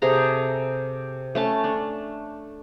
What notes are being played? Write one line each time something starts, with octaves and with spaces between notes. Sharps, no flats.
C3 G#4 A4 A#5
A3 C#4 A5
D4